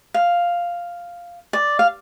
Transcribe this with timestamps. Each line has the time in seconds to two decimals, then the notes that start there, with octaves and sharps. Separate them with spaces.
0.14 F5
1.53 D5
1.79 F5